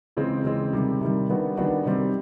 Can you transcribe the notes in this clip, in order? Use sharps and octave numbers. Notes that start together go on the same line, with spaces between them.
C#3 E3 G#3 C4
C#3 E3 G#3 C4
C3 D#3 G3
C3 D#3 G3
D#3 G3 B3 D4 F#4
D#3 G3 B3 D4 F#4
C3 D#3 G3 C4